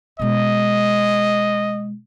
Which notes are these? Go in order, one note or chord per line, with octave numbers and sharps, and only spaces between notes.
B2 G#3 D#5